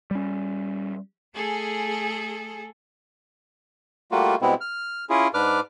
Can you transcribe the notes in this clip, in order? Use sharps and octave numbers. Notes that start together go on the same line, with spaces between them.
G3 C#4
A3 G#4 A4
G3 A3 A#3 F4 F#4
B2 G3 G#3 B3 C4 E4
F6
C#4 E4 F4 G#4
G#2 D4 B4 D6 F6